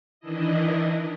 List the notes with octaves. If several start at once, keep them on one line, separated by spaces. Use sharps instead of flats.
D#3 E3 D4 E4 D#5